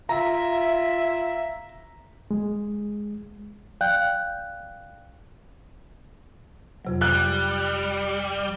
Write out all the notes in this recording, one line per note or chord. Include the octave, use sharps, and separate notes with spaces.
F4 E5 A#5
G#3
D5 F5 G5 F#6 G6
F2 C3 F#3
G3 F#6